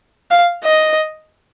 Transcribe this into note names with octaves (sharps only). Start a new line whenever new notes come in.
F5
D#5